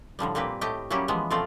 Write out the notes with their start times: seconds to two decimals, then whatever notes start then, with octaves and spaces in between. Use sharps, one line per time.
0.19 A2 D3 F3 G3
0.35 A#2 A#3 C4 G4 B4
0.61 A2 A3 G4 D#5 G5
0.90 F#3 G3 A#3 C#4 E4 G4
1.08 E3 F3 G#3 B3
1.30 B2 F3 A3 C4 F4 D5